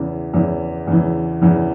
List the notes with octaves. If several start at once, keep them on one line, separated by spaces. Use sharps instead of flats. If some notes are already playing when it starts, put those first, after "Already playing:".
Already playing: E2 C#3 E3
E2 C#3 E3
E2 C#3 E3
E2 C#3 E3